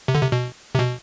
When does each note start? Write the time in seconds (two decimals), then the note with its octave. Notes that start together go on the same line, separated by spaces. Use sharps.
0.08 C3
0.15 D3
0.22 C3
0.32 B2
0.75 C3
0.79 B2